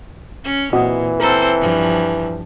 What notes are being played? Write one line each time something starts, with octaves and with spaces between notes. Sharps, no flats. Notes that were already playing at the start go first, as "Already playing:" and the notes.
C#4
A#2 E3 C4 F#4 D#5
C4 A4 A#4 C5
G2 F3